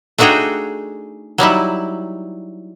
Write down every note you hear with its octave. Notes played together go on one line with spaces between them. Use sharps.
A3 D4 D#4 F#4 G#4 G5
F#3 G3 D#4 E4